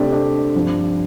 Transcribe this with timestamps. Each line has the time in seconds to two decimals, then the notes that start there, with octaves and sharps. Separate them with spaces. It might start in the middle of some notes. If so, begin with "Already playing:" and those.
Already playing: C3 A3 C4 D4 G4
0.12 D4
0.55 G2 F3 C4